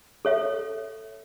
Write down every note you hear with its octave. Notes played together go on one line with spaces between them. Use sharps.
A4 C#5 E5